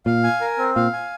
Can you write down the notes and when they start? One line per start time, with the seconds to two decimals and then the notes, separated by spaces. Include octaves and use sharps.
0.06 A#2 F5
0.24 G#5
0.41 A#4
0.58 C4
0.76 A#2 F5
0.93 G#5